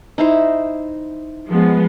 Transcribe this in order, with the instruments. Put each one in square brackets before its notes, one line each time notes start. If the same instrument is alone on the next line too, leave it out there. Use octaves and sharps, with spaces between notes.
[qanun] D#4 E4 C5
[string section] F3 G#3 B3